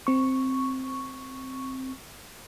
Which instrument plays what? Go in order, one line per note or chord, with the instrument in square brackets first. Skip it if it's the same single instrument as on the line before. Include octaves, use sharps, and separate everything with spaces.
[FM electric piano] C4 C#6